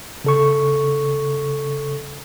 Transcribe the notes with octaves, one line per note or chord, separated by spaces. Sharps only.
C#3 A4 C#6